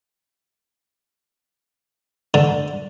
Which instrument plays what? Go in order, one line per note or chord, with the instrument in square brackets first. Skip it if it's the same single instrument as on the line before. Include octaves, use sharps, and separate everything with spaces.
[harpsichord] D3